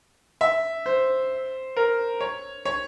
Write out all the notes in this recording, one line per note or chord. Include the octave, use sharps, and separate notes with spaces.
E5
C5
A#4
C#5
C#5